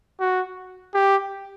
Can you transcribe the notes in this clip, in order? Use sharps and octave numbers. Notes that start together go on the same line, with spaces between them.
F#4
G4